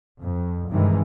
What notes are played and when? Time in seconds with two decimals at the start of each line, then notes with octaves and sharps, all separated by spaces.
0.21 F2
0.71 G2 C3 D#3 E3 G#3